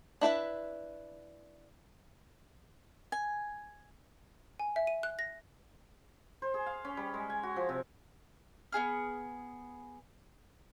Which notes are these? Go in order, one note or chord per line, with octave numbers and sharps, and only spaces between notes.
D4 E4 B4 E5
G#5
G#5
E5
D#7
F#6
A#6
C5
G#4
F5
C#4
G3
G#3
G#5
F#4
F3
C3
B3 E4 G#4 F6